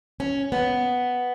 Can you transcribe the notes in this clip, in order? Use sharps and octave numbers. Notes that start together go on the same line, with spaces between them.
C#4
B3